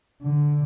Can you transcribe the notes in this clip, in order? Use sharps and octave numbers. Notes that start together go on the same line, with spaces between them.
D3